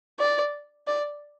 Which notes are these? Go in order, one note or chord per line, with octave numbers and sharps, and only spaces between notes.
D5
D5